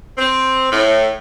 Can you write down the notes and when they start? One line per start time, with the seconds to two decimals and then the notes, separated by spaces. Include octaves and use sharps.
0.18 C4
0.71 A2